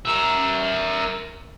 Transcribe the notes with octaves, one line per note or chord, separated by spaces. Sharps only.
A#4 E5